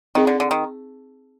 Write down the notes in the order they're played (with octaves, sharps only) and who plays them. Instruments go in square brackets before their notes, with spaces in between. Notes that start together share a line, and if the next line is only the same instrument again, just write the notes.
[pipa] D#3 [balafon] C4 D#4 G#4
[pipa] D3
D3
D#3